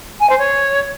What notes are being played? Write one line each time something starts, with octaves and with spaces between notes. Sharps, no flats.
G#5
C5
C#5